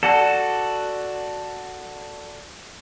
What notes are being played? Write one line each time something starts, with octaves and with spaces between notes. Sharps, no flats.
F#4 A4 D5 F#5 A5